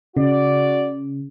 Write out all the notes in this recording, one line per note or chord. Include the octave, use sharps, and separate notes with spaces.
C#3 F#4 D5